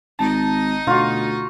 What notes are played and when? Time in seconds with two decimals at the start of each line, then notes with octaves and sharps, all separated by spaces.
0.19 G#1 D#4 D#5 A5
0.87 D2 B2 F4 F#4